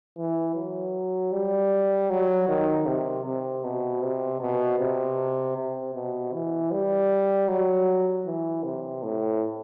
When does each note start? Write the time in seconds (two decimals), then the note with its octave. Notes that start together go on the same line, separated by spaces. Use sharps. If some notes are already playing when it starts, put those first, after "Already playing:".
0.17 E3
0.55 F#3
1.32 G3
2.10 F#3
2.48 D#3
2.86 C3
3.25 C3
3.64 B2
4.02 C3
4.41 B2
4.79 C3
5.57 C3
5.95 B2
6.33 E3
6.71 G3
7.48 F#3
8.26 E3
8.64 C3
9.03 A2